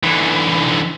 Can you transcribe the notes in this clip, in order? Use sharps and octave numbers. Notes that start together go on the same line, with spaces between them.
D3 E3